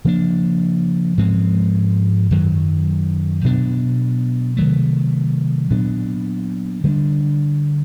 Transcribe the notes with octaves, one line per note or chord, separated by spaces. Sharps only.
C#3 F3 A#3 D4
G#2 F3 G#3 C4
F#2 D#3 F#3
B2 F#3 B3 D4
C3 D#3 F#3 A3
A#2 F#3 B3 D4
D3 G3 B3 D4